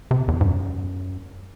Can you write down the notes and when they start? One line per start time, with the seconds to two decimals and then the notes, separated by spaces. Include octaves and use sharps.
0.11 C3
0.28 E2
0.41 G#2
0.45 F#2